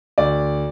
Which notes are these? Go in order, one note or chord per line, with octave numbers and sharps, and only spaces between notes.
D2 D5